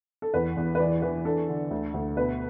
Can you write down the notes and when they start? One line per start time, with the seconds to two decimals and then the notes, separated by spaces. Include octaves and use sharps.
0.22 A4
0.34 E2 B4
0.57 E2
0.75 B4
0.79 E3 D5
1.02 E3 B4
1.25 D4 A4
1.49 D3
1.71 D2
1.94 D2
2.17 B2 B4